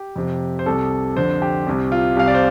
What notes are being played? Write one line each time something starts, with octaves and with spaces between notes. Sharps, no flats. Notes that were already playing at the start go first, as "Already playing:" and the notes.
Already playing: G4
F2 C3
C5
C2 C3 A4
F2 D3 C5
G4
C2 C3
F4
C2 C3 F5
D5
C5